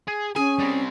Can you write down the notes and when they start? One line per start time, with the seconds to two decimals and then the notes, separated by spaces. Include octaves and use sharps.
0.08 G#4
0.36 C#4 G#4 G#5
0.59 G3 C4